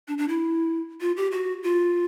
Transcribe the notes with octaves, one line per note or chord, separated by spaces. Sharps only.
D4
D4
E4
F4
G4
F#4
F4